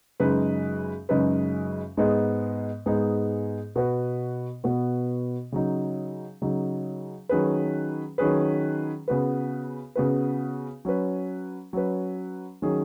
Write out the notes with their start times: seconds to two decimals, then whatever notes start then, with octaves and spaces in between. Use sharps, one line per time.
0.20 F#2 C#3 G#3 D#4 B4
1.09 F#2 C#3 G#3 D#4 B4
1.97 G#2 G#3 B3 D#4 G#4
2.86 G#2 G#3 B3 D#4 G#4
3.76 B2 B3 F#4 B4
4.64 B2 B3 F#4 B4
5.52 C#3 F#3 D#4
6.42 C#3 F#3 D#4
7.29 D#3 F#3 C#4 G#4 B4
8.18 D#3 F#3 C#4 G#4 B4
9.08 C#3 B3 F#4 B4
9.95 C#3 B3 F#4 B4
10.85 F#3 C#4 B4
11.73 F#3 C#4 B4
12.62 D#3 F#3 C#4 G#4